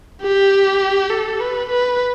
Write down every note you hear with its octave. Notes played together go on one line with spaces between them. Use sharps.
G4
A4
B4
B4